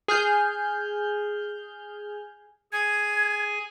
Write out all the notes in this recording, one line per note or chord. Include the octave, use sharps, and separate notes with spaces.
G#4 F6 G6
G#4 G#5 G#6